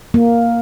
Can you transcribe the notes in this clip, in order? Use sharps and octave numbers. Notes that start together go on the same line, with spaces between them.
A#3